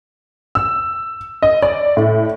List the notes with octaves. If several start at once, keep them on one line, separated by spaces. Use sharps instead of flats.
E6
D#5
D5
A2